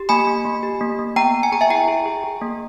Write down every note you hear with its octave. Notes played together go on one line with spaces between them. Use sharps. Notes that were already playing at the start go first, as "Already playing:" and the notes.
Already playing: G4
A#3 G#5 B5
A#3
A#3
G4
A#3
A#3
B3 G5 A#5
B3
G#5
G#4 A#5
E5 G#5
E4 G5 A#5
G#4
G#4
G#4
A#3